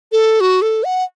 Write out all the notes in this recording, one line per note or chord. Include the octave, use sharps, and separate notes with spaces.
A4
F#4
A4
F#5